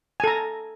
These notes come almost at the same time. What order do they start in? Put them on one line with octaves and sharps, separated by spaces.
G#5 A4 A#5